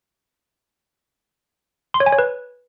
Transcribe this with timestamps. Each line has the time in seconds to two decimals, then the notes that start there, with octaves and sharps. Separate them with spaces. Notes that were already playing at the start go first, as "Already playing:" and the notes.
1.94 C6
2.00 C#5
2.06 G#5
2.12 C#5
2.18 B4